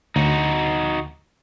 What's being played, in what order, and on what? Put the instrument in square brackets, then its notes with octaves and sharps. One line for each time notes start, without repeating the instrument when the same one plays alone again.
[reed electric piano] D2 [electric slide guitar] D#4 F#4